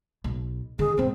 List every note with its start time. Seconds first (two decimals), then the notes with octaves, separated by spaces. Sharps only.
0.24 B1
0.79 D#3 C#4 G#4
0.98 B1 G#2 C4